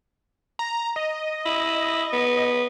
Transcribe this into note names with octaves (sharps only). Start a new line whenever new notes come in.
A#5
D#5
E4
B3